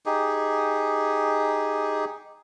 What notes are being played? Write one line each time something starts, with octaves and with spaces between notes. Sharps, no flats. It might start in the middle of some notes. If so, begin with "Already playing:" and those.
D#4 G4 G#4